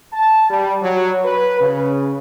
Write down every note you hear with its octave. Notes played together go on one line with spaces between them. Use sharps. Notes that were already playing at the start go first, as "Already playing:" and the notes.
A5
G3
F#3
B4
C#3